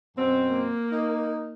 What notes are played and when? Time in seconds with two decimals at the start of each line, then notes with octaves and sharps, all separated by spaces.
0.17 F#2 B2 C4
0.50 A#3
0.91 D#4